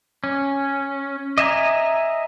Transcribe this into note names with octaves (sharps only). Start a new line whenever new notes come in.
C#4
D#5 E5 G#5 A#5